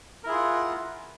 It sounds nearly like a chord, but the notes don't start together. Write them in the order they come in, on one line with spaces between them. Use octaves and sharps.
A#4 E4 G#4 F4 F#5